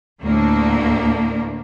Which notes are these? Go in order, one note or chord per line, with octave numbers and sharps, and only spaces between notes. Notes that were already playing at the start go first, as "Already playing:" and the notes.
D2 A2 A#3 D4